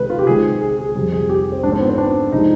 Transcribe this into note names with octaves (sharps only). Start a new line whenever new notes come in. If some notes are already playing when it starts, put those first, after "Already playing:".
Already playing: C3 D#3 G#3 B4
F4
G4
C3 D#3 G#3 G#4
G#4
G#4
F2 C3 G3 G#4
G#4
G4
C4
G#2 F3 G#3 D4
C4
B3
C4
D4
C3 F3 G#3 D#4